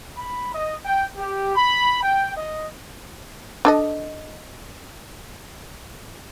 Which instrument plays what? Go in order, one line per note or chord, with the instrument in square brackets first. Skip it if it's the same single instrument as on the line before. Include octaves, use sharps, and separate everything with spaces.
[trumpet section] B5
D#5
G5
G4
B5
G5
D#5
[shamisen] D4 A4 D#5